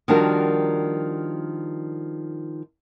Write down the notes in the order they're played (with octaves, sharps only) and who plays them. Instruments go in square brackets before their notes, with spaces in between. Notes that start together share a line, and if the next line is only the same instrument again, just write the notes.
[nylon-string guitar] D#3 F3 G3 D4 F#4 A#4